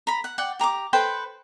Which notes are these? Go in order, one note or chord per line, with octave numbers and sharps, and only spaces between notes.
A#5 B5
F#5
D5 F#5 G5
G4 A#5 C6 D6
A4 B4 C5 G5